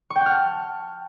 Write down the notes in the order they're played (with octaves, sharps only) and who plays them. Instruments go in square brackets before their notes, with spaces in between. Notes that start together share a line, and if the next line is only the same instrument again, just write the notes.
[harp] C#6
G5
F#5
F6
A5